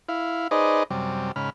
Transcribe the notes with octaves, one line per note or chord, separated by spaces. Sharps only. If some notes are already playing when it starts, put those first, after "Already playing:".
E4 F5
D#4 G#4 B4 C5 D5 D#5
F#2 C3 G3
G#2 C#3 B5 F6